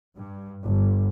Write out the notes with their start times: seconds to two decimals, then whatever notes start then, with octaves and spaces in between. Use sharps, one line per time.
0.16 G2
0.64 G1